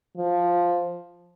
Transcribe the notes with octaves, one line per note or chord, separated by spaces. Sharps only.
F3